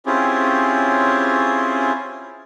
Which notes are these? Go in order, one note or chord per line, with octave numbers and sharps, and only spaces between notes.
C4 C#4 E4 F4 G4 G#4